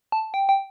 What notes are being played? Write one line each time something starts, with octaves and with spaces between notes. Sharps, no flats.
A5
G5
G5